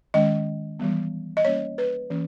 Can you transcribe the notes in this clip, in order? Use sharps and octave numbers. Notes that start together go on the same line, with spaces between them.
D#3 G#3 C#4 D#5
E3 G3 B3
D#5
G3 A#3 C#4 C#5
B4
E3 A#3 C#4